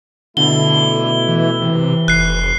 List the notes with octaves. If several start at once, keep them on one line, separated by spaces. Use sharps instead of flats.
B2 D3 A3 E4 G7
E3
C3 E3
F1 F#6 C7